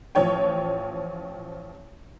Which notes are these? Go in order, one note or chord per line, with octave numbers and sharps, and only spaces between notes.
A1 F3 C#5 G5